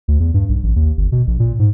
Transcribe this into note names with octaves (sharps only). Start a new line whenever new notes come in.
D2
E2
G2
B1
A1
D#2
G1
B2
A#1
A#2
G#2